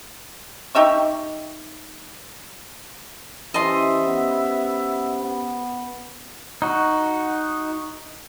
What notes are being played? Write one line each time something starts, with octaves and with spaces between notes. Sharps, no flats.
D#4 G4 E5 C#6
E3 C#4 G4 C5 D#5 E5 A5 C6
B3
B3
D#4 F#4